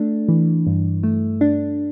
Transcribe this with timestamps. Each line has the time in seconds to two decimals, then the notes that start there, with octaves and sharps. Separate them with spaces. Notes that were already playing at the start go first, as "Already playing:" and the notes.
Already playing: A3 D4
0.29 E3
0.67 G2
1.03 A3
1.41 D4